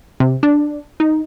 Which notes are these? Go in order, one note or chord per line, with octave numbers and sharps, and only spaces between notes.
C3
D4
D#4